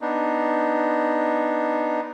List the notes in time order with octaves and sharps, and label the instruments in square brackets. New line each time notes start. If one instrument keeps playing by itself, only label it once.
[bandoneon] B3 D4 D#4